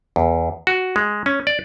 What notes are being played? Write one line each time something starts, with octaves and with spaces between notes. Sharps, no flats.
E2
F#4
G#3
C#4
D5